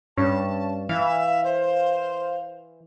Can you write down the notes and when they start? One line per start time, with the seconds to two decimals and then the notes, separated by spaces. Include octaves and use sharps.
0.18 G2 C#4 A5
0.89 E3 E5 F5
1.44 C5